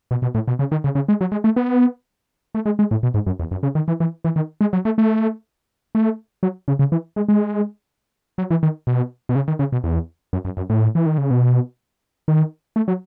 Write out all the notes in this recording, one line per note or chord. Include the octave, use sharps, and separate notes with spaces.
B2
B2
A2
B2
C#3
D#3
C#3
C#3
G#3
F#3
G#3
A3
B3
A3
G#3
G#3
A2
B2
G#2
F#2
E2
F#2
C#3
D#3
E3
E3
E3
D#3
G#3
F#3
A3
A3
A3
F#3
C#3
C#3
E3
G#3
G#3
F#3
E3
D#3
B2
B2
C#3
D#3
C#3
B2
E2
F#2
F#2
F#2
A2
E3
D#3
C#3
B2
D#3
A3
F#3